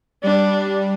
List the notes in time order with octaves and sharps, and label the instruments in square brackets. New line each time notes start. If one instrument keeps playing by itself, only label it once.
[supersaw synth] G3 [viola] D4